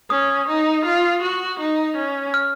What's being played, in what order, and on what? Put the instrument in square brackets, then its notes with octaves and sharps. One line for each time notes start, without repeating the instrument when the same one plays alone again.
[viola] C#4 [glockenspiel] D#6
[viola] D#4
F4
F#4
D#4
C#4
[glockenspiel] F6